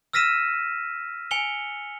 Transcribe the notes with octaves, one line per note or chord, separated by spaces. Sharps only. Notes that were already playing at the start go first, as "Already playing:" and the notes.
E6 F6 A#6 B6 D#7 E7
G#5 C#7 F7 G7